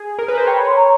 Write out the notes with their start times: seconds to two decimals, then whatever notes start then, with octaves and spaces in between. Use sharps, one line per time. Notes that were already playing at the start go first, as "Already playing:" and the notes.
Already playing: G#4
0.19 A#4
0.28 B4
0.38 C5
0.47 C#5 G5
0.57 B5
0.66 C6
0.76 A#5